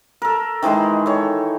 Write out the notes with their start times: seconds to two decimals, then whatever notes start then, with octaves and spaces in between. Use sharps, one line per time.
0.22 A4 A#4
0.62 D#3 E3 G#3 C6
1.06 A4 C#5